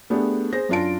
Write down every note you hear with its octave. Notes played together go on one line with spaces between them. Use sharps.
A3 B3 D4 G4 G#4
G#4 C5 A#6
F#2 D4 F4 A5 D7